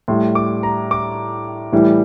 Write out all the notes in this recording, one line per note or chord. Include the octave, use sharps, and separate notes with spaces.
A2 G3 C6
D6
A#5
D6
A2 E3 G3